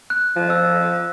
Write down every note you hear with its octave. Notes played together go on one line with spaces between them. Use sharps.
F#6
F3
E6